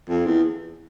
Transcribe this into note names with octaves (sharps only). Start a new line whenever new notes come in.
F2
E2